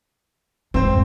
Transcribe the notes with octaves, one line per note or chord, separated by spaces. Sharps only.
F2 G#2 C4 C5